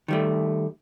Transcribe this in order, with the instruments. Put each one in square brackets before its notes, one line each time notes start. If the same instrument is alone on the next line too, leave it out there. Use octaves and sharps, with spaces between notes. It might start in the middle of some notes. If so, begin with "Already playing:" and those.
[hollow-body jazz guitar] D#3 G3 A3